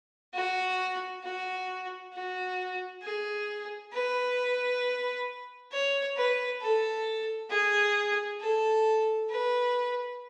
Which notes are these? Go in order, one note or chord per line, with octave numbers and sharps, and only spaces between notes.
F#4
F#4
F#4
G#4
B4
C#5
B4
A4
G#4
A4
B4